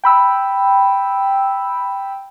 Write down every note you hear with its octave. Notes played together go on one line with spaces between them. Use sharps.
G5 B5 E6